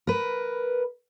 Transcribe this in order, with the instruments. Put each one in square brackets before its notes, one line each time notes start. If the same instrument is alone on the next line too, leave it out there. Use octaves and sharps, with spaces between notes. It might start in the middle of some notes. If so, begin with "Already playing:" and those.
[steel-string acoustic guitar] A#4 B4